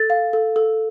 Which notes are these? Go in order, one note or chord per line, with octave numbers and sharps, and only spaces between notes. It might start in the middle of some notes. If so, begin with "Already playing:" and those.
Already playing: A4 A6
F5
A4
A4